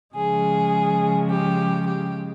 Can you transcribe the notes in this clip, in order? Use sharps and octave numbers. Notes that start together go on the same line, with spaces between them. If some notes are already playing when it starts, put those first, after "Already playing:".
C#3 F3 G#3 G#4
G4
G4